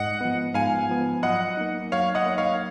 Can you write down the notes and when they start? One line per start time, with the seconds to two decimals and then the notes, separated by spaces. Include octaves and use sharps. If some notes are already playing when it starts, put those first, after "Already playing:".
Already playing: G#2 D#5 F#5
0.21 F3 B3
0.54 G#2 F5 G#5
0.89 F3 B3
1.23 F#3 D#5 F#5
1.57 A#3 D#4
1.92 F#3 C#5 F5
2.15 D#5 F#5
2.26 A#3 D#4
2.38 C#5 F5